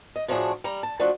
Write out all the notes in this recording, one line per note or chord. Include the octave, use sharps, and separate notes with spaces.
D#5
A2 F3 A3 D4 F#4 G#4
G3 A#5
A5
F3 A3 D4 F#4